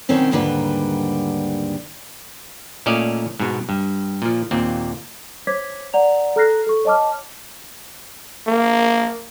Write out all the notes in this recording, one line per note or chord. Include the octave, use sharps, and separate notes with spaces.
B2 D#3 G3 C4 C#4
D#2 G#2 D3 G3 B4
A#2 A3 C#4 D5 D#5 F5
G#2 B2
G2
A#2 F3
D#2 A#2 C4
C5 C#5 D6 G#6 B6
D5 F#5 A#5 F7
A4 A#5 F6 F#6 A#6 C7
A4 C#6
C#5 D#5 A5 D6 F6
A#3